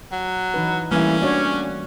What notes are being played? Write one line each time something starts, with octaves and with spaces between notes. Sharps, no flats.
F#3
E3 D#4 B4
E3 G3 A3 A#3 C#4 E4
D4 F#4 C#5